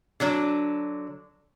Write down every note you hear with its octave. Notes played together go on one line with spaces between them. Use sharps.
D3 F#3 D4